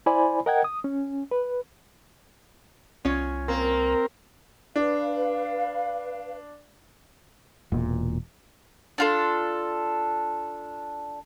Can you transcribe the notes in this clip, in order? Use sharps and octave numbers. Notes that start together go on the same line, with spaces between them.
E4 C5 D5 G#5 B5
A#4 D#5 F#5 G5 G#6
D#6
C#4
B4
C2 C#4 F4 C#5
A#3 C4 A#4
D4 B4 F5
E1 A#2
D4 F4 A4